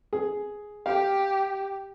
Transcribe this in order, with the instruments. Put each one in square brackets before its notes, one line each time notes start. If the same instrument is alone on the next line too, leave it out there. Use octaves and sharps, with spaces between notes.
[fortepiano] G#4
[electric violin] G4 [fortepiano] F5